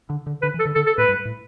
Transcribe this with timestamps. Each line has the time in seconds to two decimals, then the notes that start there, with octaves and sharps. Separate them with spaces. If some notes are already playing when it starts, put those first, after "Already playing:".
0.10 D3
0.26 D3
0.42 D3 B4
0.54 E3
0.59 A4
0.65 D3
0.75 D3 A4
0.87 A4
0.98 A2 B4
1.08 G2
1.25 A2